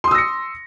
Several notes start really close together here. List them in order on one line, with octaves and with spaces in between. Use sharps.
C6 D#6 E6 A#6 C#7